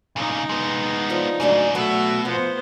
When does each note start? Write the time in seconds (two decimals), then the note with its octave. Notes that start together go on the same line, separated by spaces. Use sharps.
0.16 A#2 C#3 D#4
0.49 G#3 B3
1.10 F3 D4
1.40 G#2 C#3 F#3 A3 D4
1.75 B2 F#3 A3 E5
2.25 F3 B3 C5